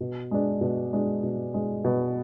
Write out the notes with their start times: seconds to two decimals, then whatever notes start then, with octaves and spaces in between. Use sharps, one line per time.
0.01 B2
0.31 G#3 D4
0.61 B2
0.93 G#3 D4
1.23 B2
1.54 G#3 D4
1.84 B2